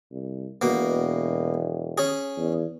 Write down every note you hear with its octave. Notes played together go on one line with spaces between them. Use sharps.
C2
E1 B2 A#3
C#4 G#4
E2